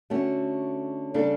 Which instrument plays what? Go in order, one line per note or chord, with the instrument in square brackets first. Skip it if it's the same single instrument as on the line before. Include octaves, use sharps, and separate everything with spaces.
[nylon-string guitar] D3 A3 C#4 F#4
C#3 G3 D4 A4